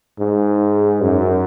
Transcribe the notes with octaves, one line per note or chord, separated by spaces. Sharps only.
G#2
F#2